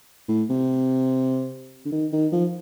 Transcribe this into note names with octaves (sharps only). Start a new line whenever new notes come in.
A2
C3
D3
D#3
D#3
F3